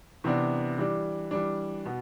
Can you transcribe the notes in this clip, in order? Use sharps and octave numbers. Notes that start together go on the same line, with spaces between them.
C3 E3 B3 D4
E3 G3 D4
E3 G3 D4
B2 B3